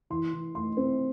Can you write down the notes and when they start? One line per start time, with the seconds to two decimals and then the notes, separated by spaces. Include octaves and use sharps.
0.10 E3 C6
0.33 E3
0.55 A3 C6
0.77 C4